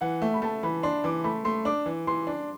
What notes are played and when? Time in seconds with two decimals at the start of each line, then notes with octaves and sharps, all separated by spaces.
0.01 E3 F#5
0.22 A3 E5
0.34 B5
0.42 A3 A5
0.63 E3 B5
0.83 D4 C6
1.04 E3 D6
1.24 A3 B5
1.45 A3 C6
1.65 D4 D6
1.86 E3
2.07 E3 C6
2.27 D4